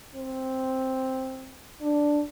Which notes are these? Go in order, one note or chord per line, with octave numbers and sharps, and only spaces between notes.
C4
D4